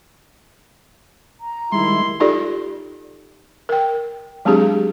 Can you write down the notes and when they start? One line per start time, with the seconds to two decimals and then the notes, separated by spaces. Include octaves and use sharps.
1.40 A#5
1.72 D#3 G3 G#3 E4 C6
2.20 D#4 F4 G4 A4 D5
3.69 A#4 G5
4.45 F#3 G#3 C4 D4 G4 G#4